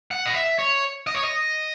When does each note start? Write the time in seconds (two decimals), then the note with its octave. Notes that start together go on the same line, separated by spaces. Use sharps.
0.11 F#5
0.26 D#5
0.35 E5
0.59 C#5
1.07 D#5
1.15 C#5
1.23 D#5